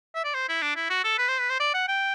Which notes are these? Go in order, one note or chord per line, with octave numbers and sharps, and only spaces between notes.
E5
D5
C5
E4
D4
E4
F#4
A4
B4
C5
B4
C5
D5
F#5
G5